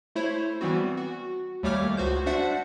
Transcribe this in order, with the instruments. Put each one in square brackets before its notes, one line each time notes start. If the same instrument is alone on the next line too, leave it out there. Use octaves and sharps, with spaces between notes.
[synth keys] A3 E4 C5 C#5
E3 G3 B3 C4 F#4
F#4
D#2 G3 A3 C#5 D6 F6
C#2 F#4 C5 G6
D4 F#4 C5 D5 E5 F#5